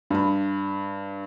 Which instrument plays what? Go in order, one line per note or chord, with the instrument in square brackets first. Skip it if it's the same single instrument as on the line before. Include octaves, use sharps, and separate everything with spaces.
[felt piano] G2 B5